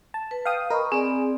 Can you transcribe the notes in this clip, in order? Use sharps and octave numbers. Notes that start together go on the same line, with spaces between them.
A5
B4
F5 G5 D#6
A#4 D#5 B5 C#6
C4 G#4 D5